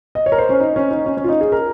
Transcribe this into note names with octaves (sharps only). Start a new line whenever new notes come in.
D#5
C#5
A#4
C5
C#4
D#4
C#4
D#4
C#4
C#4
F4
D#4
G#4
A#4